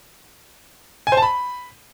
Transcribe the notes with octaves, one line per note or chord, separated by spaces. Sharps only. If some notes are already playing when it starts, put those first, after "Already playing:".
G#5
C5
A5
B5